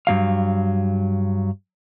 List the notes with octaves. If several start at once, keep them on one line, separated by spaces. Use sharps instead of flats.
G2 F#3 F5